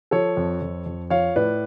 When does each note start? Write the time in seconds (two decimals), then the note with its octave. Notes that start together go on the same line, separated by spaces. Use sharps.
0.11 F3 A4 C#5
0.37 F2
0.62 F2
0.86 F2
1.10 F3 C#5 F5
1.36 A2 B4 D5